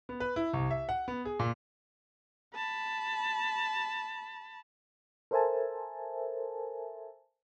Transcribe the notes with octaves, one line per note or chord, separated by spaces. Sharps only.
B3
B4
E4
C2
E5
F#5
B3
G#4
A#2
A5 B5
A4 A#4 C5 E5 G#5 A5